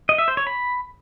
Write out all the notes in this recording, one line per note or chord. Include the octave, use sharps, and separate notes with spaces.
D#5
E5
C5
C#5
B5